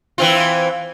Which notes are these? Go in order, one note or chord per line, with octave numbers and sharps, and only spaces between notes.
E3 C4 F4